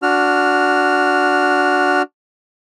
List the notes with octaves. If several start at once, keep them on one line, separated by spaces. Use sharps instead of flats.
D4 F#4 F6